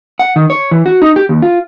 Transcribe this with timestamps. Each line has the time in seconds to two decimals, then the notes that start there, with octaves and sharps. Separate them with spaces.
0.19 F#5
0.36 D#3
0.50 C#5
0.71 E3
0.86 F#4
1.02 D#4
1.16 G4
1.29 D#2
1.42 F4